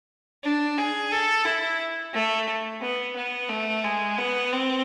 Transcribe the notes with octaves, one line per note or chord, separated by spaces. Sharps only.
D4
G#4
A4
E4
A3
B3
B3
A3
G#3
B3
C4